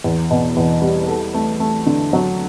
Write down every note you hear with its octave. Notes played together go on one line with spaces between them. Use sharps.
E2
B2
E2
G3
A4
A3
A3
D3
F#3